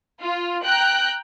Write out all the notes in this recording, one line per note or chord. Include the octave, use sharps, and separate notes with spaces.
F4
G5 A#5 F#6 G6